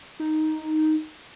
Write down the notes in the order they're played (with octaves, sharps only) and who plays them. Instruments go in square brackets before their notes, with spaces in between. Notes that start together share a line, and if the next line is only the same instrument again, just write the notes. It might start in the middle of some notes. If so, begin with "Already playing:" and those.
[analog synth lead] D#4